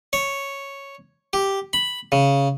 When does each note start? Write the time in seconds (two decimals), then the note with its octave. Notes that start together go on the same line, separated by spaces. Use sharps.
0.13 C#5
1.33 G4
1.73 B5
2.12 C#3